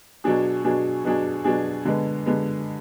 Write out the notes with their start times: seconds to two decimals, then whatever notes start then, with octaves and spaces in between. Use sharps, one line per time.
0.24 B2 F#3 D4 G#4
0.65 B2 F#3 D4 G#4
1.05 B2 F#3 D4 G#4
1.44 B2 F#3 D4 G#4
1.85 D3 G#3 B3
2.26 D3 G#3 B3